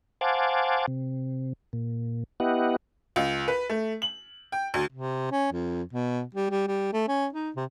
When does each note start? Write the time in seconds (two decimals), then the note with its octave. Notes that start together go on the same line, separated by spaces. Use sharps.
0.21 C5 F5 F#5 G#5 A5 D6
0.87 C3
1.73 A#2
2.40 B3 E4 G4 D#5 F#5
3.16 C#2
3.48 B4
3.69 A3
4.02 F#7
4.52 G5
4.74 D2
4.92 C3
5.32 C#4
5.53 F2
5.93 B2
6.35 G3
6.51 G3
6.68 G3
6.93 A3
7.08 C#4
7.33 D#4
7.56 C3